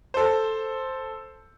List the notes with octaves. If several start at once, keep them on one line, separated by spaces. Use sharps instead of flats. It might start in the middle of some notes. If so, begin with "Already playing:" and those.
A4 C5